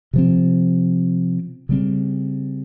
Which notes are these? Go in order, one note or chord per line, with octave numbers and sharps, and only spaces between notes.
C3 F3 C4
C#3 G3 C4